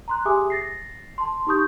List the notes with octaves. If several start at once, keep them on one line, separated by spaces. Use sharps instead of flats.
A#5 C6 F#6
G4 G#4 E5 G#5 D6 D#6
A6 A#6 C7
A5 C6
D#4 G4 C#6 D#6 G6